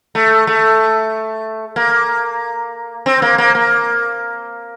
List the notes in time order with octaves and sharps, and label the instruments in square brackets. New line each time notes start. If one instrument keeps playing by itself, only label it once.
[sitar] A3
A3
A#3
C4
A#3
A#3
A#3